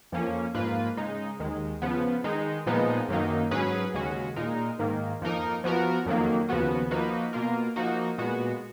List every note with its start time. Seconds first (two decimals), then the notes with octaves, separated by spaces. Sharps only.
0.12 F2 F3 A#3 C#4
0.54 G#2 F3 A#3 F4 B4
0.97 C#3 G#3 D#4
1.39 D#2 D#3 G#3
1.82 C#3 F3 B3
2.24 D#3 G#3 D#4
2.66 A#2 F3 G#3 B3 D#4
3.09 F#2 D#3 F#3 A#3 D#4
3.51 G#2 F#3 C#4 G#4 B4
3.93 D#2 C#3 G#3 C#4 F#4
4.36 A#2 G#3 D#4 A#4
4.79 G#2 D#3 A#3
5.22 F2 F3 A#3 D#4 A#4
5.64 F3 B3 F#4 A#4
6.06 F2 D#3 F#3 A#3
6.49 D#2 C#3 F3 B3 F#4
6.91 F3 A#3 D#4 F#4 B4
7.33 B2 A#3 F4 A#4
7.76 F3 A#3 D#4 F#4
8.18 A#2 G#3 B3 F#4